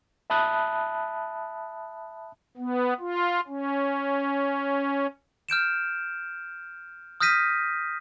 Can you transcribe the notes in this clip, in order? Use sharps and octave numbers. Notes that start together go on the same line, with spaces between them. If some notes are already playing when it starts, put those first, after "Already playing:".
E5 A5 B5 D#6 F#6
B3
F4
C#4
F6 G6 D7 E7
D#6 F6 G6 A#6 B6 D#7